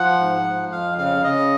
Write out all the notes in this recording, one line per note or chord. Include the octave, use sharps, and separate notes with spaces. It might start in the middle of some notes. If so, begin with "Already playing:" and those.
Already playing: F3 F#5
G#2
F3
F2 F5
C#3 F5
C#3 D#5